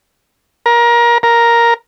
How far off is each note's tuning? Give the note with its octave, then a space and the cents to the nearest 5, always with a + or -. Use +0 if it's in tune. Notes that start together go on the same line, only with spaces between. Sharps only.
A#4 +25
A#4 +5